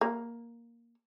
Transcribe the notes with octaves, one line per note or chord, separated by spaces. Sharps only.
A#3